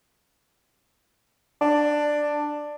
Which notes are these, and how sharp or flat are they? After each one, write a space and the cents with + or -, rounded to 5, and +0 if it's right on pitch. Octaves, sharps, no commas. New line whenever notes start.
D4 +10